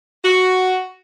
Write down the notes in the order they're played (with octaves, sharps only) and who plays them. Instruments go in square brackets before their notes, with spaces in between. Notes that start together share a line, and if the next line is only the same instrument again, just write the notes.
[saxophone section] F#4